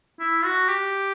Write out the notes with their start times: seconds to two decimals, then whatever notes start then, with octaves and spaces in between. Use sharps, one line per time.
0.20 E4
0.45 F#4
0.69 G4